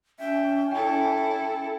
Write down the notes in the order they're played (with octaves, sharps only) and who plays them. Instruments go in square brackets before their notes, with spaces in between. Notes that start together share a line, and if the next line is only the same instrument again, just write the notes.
[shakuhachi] C#4 [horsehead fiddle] E5 G5
[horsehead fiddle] E4 A4 [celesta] G5